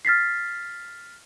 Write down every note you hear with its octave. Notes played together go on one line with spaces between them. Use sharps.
F6 A6 B6 C7